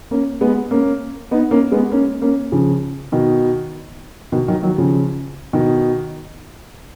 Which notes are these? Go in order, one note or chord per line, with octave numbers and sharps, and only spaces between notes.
A#3 C#4
G#3 B3
A#3 C#4
B3 D#4
A#3 C#4
G#3 B3
A#3 C#4
A#3 C#4
C#3 F3
B2 D#3
B2 D#3
D#3 F#3
D#3 F#3
C#3 F3
B2 D#3